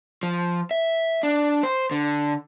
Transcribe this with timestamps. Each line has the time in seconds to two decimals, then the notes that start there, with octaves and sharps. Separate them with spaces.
0.23 F3
0.71 E5
1.23 D4
1.63 C5
1.91 D3